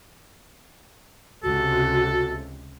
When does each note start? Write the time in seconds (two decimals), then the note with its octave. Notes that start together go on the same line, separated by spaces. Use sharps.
1.43 C#2 C3 F#4 A4